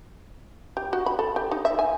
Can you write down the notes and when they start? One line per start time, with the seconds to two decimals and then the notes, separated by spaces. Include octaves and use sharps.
0.77 G4
0.93 F#4
1.06 B5
1.19 A4
1.36 G4
1.51 D#4
1.65 E5
1.79 G#5